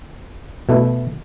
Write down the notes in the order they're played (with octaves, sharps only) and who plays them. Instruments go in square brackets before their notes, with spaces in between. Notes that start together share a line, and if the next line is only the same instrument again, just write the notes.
[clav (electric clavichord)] B2 A3 E4